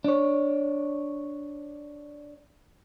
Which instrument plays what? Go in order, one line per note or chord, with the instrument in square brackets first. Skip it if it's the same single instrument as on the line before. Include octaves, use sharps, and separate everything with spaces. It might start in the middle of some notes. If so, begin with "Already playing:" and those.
[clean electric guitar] D4 C#5